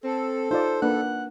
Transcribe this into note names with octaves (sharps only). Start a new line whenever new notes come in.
C4 A4
D#4 F4 C5 D5
A#3 D4 B4 F#5